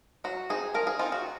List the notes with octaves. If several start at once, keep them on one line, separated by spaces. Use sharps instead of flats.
F#3 F#4
C4 D#4 G#4
F3 A#4
G#4
C4 D#4 F4
F#4